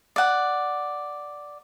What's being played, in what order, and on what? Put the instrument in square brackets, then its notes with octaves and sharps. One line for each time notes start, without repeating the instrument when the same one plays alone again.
[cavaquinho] D5 F#5